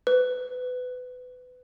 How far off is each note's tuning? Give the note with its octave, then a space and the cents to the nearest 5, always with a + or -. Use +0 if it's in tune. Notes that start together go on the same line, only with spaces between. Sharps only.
B4 +25